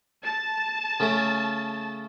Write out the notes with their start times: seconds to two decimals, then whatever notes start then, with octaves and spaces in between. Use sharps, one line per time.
0.25 A5
1.00 C#3 A3 C#4